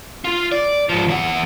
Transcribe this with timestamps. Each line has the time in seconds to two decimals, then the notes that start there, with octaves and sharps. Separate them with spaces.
0.25 F4
0.52 D5
0.89 G#2 F3
1.08 E2 F#5